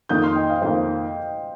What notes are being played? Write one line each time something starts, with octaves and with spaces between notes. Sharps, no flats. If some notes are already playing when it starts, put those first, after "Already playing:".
F2 D#3 A#3 D#6 G6
C6 F6
D#5 G5
C5 F5
F2 D#3 A#3 C5 F5